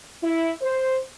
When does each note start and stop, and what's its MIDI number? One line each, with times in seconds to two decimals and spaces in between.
0.23 0.52 64
0.61 0.98 72